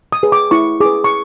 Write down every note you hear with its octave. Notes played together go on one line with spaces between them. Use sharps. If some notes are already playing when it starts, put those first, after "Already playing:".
D#6
G#4 B4
D6
E4 C#6
G#4 B4 D6
C#6